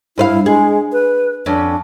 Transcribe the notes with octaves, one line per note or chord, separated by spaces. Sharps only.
G2 E4 B4 F5
G#3 G#4
B4
F2 C#4 D4